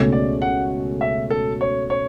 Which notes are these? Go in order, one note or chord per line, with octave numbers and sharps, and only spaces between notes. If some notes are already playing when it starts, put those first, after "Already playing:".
Already playing: C#2 B2 A3 C#4
D5
F#5
E5
A4
C#5
C#5